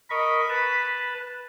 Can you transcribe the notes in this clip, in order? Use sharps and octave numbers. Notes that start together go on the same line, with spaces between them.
A#4 D#5 B5 C#6
B4 A5